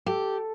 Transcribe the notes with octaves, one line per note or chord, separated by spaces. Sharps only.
G4 A4